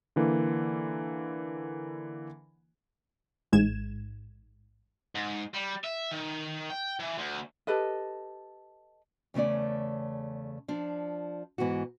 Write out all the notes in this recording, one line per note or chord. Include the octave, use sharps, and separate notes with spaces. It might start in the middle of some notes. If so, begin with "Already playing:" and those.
D3 E3 A#3
A1 G#2 G#3 G#6 E7
G#2
G3
E5
D#3
G5
E3
D2
G4 A4 B4 D#5
E2 C#3 A3 C#4 D5
F3 D4
G#2 E3 B3 F#4